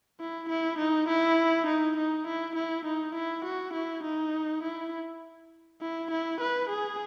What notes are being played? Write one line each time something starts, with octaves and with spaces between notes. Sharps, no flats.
E4
E4
D#4
E4
D#4
D#4
E4
E4
D#4
E4
F#4
E4
D#4
E4
E4
E4
B4
G#4